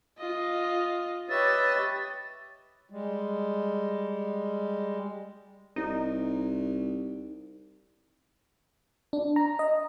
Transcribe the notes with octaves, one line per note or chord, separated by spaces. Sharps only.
F4 D#5
G4 B4 C#5 D#5 E5 A6
G3 G#3
C2 D#4
D4
A#5
D#5